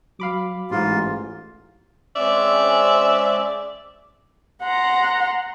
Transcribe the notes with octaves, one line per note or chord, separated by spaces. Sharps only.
F#3 F5 B5 D6
A1 G#2 F4
G#3 C4 C#4 D5 E5
F#5 A#5 C6